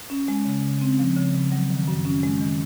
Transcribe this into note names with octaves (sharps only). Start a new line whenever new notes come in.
C#4
G#3
C#3
C#3
C4
F3
C#3
C#3
F#3
D#3
F#2
C#4
G#3
D#3